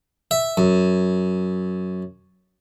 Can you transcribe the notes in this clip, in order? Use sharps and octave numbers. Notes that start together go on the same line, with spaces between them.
E5
F#2